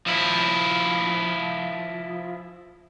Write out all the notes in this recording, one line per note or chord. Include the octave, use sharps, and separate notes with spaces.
F3 E4